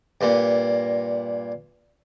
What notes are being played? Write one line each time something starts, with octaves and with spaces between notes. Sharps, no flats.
G2 A#2